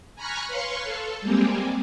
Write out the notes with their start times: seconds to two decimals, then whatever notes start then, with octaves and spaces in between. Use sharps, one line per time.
0.15 G#5 A#5 B5 C#6 F6 F#6
0.48 B4 C#5 F5 C6 C#6
0.84 A4
1.21 G3 G#3 A#3 C4 G4 G#4